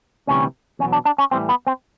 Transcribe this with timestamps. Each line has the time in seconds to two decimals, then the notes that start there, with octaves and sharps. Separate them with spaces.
0.27 D2 C3 E3 G3 C#4
0.79 E2 B2 F#3 C#4
0.92 D4
1.05 D4
1.18 C#4
1.31 A2 E3 G3 C4
1.49 B3
1.67 C4